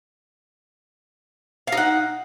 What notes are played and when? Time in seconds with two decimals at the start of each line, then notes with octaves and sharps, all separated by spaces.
1.67 F5
1.72 D#4
1.77 F#5